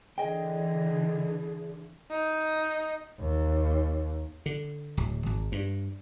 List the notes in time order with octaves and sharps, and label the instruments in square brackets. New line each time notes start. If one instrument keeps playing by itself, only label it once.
[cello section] D3 E3 [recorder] G#4 [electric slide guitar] D#5 G5
[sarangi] D#4
[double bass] D#2
[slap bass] D3
D1
G#1
G2